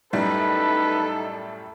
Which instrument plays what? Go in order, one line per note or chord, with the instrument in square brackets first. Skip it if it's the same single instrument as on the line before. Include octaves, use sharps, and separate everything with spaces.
[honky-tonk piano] F#2 A2 G3 [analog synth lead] D#4 [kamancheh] A4 [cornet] B4